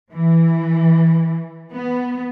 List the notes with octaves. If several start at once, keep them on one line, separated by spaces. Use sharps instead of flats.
E3
B3